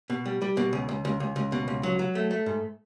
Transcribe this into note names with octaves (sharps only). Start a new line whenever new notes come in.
B2
G3
G3
B2
C#2
C#2
C#2
C#2
C#2
B2
C#2
F#3
F#3
A3
A3
G#2